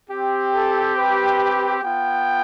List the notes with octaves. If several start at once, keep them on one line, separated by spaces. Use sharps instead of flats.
C4 G4
A4
B4
B3 F4 G5